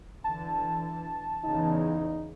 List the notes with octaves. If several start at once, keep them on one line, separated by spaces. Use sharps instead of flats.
D3 E3 A5
E2 C#3 D#4